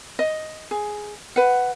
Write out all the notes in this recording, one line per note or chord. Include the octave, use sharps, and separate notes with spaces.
D#5
G#4
B4 F#5